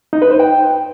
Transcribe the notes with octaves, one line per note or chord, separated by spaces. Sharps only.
D#4
B4
C5
G5